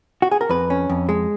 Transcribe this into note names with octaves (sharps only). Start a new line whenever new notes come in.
F#4
G#4
A#4
F2 B4
C#4
F2
G#3